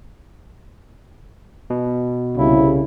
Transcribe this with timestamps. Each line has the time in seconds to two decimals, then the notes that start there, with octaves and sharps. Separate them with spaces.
1.70 B2
2.37 C2 C#3 E4